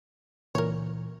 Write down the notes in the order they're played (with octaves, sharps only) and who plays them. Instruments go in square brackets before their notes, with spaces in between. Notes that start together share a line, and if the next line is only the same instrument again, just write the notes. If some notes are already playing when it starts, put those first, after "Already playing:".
[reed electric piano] C#2 A#2 E3 [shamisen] A#4 C#5